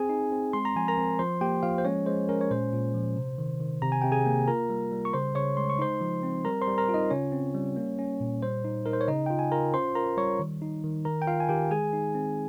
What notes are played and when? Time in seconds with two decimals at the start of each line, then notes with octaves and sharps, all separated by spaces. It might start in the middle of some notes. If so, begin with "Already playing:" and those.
Already playing: C4 G#4 G#5
0.09 D#4
0.32 C4
0.53 G#3 C6
0.65 A#5
0.76 F3 G#5
0.88 A#4 A#5
0.98 C4
1.19 F3 C5 C6
1.41 A#3 G4 G5
1.63 F3 F4 F5
1.78 C5
1.85 G#3 C#4 C#5
2.06 G#3 C5
2.29 C#4 A#4
2.41 C#5
2.51 A#2 C5
2.73 A#2
2.94 F3
3.16 C3
3.38 D#3
3.60 D#3
3.82 C3 A#5
3.92 G#5
4.02 C3 G5
4.12 G#4 G#5
4.26 A#3
4.48 F4 A#4 A#5
4.70 G3
4.92 G3
5.05 C#6
5.13 C#3 C5 C6
5.35 C#3 C#5 C#6
5.57 G#3 C6
5.70 C#6
5.79 D#4 C5 C6
6.01 F3
6.23 C4
6.45 G3 A#4 A#5
6.61 C5 C6
6.67 G3
6.78 A#4 A#5
6.89 F4
6.94 D#4 D#5
7.11 C#3 C#4 C#5
7.32 C4
7.54 G3
7.76 A#3
7.99 C#4
8.20 A#2
8.42 G3 C5
8.64 D#4
8.86 D#4 A#4
8.93 C5
9.01 C#5
9.08 C#3 D#4 D#5
9.26 F4 G5
9.39 G#5
9.52 F4 A#4 A#5
9.74 C#4 C5 C6
9.95 F4 A#4 A#5
10.17 G3 C#5 C#6
10.39 D#3
10.62 D#4
10.83 D#3
11.05 D#3 A#4 A#5
11.22 G5
11.27 F4 F5
11.40 G#5
11.49 D#3 G4 G5
11.71 G#3 G#4 G#5
11.93 D#4
12.15 C4